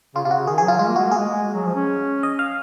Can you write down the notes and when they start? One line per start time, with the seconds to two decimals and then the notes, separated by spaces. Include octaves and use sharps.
0.15 C#3 F4
0.25 C3 F4
0.31 C#3 F#4
0.47 D#3 G#4
0.58 G#4
0.63 F#3 F4
0.79 G#3 F4
0.89 A#3
0.96 G#3 F#4
1.08 A#3 G#4
1.18 G#3
1.43 G#3
1.54 F#3
1.65 F3
1.75 C#4
2.23 D#5
2.39 F5